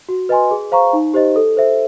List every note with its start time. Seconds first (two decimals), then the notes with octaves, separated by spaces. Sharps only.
0.09 F#4
0.29 B4 D#5 G#5 C6
0.51 G#4
0.72 C5 F5 A#5 C#6
0.93 D#4
1.14 G4 C5 D#5
1.36 A4
1.57 C5 E5